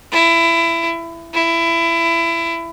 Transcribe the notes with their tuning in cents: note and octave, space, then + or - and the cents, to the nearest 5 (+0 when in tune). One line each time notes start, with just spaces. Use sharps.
E4 +20
E4 +20